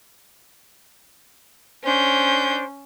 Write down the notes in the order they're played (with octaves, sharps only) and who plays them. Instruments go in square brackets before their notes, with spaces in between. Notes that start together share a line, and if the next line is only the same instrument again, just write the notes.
[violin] C#4 G6 [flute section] D4 C5